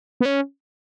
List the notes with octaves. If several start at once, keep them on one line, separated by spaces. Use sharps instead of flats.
B3
C#4